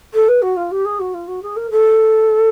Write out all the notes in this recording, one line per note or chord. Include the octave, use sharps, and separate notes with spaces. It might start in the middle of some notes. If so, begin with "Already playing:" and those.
A4
B4
F#4
F4
G4
G#4
F#4
F4
F#4
G#4
A#4
A4